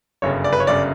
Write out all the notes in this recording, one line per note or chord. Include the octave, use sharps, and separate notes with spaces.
G1 F#2 C#3 C#5
D5
B4
C#5
G1 F#2 C#3 D5